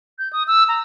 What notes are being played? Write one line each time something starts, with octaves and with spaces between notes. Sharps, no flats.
G6
D#6
E6
A#5